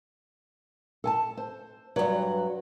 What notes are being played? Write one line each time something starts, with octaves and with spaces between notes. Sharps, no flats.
A4 G#5 A5
C5
G2 F#3 B4